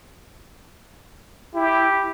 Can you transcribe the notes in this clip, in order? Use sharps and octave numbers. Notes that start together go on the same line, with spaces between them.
E4 G4